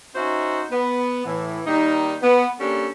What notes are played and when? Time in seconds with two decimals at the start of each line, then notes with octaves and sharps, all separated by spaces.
0.15 C#4 D#4 F#4 C5 E5
0.71 B3
1.26 A2 E3
1.66 D#3 G3 A#3 D#4
2.22 B3
2.59 G3 A#3 C#4 D4 A4